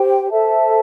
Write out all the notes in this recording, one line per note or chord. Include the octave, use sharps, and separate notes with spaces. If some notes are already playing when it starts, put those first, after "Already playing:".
Already playing: G4 C5 G5
A4 C5 E5 A5